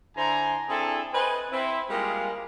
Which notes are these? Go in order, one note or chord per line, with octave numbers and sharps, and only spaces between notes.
D3 E4 C5 G#5 A#5
C4 D4 E4 G#4 A4
B4 C5 D#5 G#5
C4 E4
G3 G#3 A#3 F4 A#4 F5